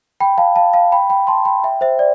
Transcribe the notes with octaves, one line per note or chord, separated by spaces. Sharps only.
G5 B5
F5 A5
F5 A5
F5 A5
G5 B5
G5 B5
A5 C6
G5 B5
E5 G5
C5 E5
D5